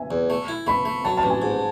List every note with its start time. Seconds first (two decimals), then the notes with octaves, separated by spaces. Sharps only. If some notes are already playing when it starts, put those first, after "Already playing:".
Already playing: E5 G#5
0.11 E2
0.30 A3
0.48 E4
0.67 A3 B5
0.85 A3
1.04 F#3 A5
1.17 A5
1.23 A1
1.30 G#5
1.42 G#2